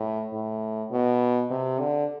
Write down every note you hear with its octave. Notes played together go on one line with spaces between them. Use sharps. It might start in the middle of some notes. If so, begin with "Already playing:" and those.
Already playing: A2
A2
B2
C3
D3